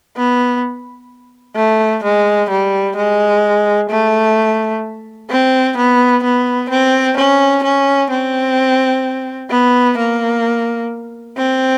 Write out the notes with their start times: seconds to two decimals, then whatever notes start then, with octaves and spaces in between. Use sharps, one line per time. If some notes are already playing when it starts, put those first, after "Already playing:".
0.17 B3
1.56 A3
2.04 G#3
2.50 G3
2.96 G#3
3.90 A3
5.30 C4
5.77 B3
6.24 B3
6.70 C4
7.17 C#4
7.64 C#4
8.10 C4
9.51 B3
9.97 A#3
11.37 C4